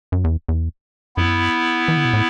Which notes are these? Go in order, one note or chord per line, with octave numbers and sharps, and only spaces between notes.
F#2
E2
E2
F#2 B3 E4
E3
D3
B2
A2